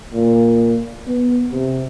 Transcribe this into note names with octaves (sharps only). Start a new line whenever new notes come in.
A#2
B3
C3